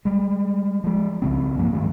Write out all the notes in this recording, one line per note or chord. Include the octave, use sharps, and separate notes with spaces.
G3 G#3
F3 G#3
C#2 C#3 C4
G2 F3 A#3 B3
G2 D#3 G#3 A3